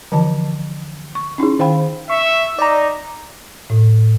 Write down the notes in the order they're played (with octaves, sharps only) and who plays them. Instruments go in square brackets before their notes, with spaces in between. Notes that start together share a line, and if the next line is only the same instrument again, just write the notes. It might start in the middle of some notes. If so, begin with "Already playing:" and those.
[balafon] D3 E3 F3 A5
C#6
C#4 D#4 E4 G#4
D#3 C5 F5 G5 B5
[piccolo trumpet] E5 [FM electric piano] C#6
[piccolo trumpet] D#4 [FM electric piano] D5 A#5
[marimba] A2